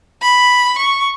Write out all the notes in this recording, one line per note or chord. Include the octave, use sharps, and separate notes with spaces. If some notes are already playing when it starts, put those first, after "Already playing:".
B5
C#6